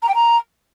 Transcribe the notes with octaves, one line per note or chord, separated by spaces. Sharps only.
A#5
G5
A#5